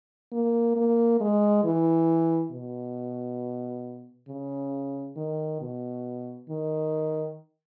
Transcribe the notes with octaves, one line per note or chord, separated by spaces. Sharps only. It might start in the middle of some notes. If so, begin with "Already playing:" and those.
A#3
A#3
G#3
E3
B2
C#3
D#3
B2
D#3